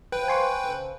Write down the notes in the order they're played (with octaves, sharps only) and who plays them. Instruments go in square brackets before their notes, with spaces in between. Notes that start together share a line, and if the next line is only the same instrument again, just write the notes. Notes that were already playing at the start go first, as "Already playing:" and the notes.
[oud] F3 C4 [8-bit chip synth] B4 G5
[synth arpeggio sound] G#5 C6 C#6
[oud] C#3 A4 C5